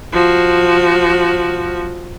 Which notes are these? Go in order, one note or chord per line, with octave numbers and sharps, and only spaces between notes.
F3 F#4